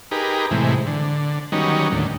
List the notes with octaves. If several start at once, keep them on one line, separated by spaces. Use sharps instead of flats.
D#4 G4 G#4 A#4 B4
A2 C3 E3 G#3
D3
D#3 F#3 G3 B3 C#4 D#4
D#2 A2 D3